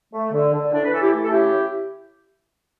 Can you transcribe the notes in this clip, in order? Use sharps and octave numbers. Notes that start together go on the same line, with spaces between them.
A3
D3
D3
A2 D4
B4
E3 A4
E4 G4
A3
A4
C#3 E4 G4